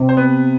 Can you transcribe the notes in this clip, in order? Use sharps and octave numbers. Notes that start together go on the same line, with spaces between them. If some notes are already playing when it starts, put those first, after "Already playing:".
Already playing: C3
C5
B3 B4